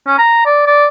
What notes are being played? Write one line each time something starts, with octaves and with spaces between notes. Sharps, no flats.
C#4
A#5
D5
D5